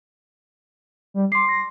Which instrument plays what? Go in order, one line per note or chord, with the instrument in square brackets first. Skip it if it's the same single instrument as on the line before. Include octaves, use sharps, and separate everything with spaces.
[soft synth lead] G3
[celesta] C6 C7 [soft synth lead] D6
[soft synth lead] A#6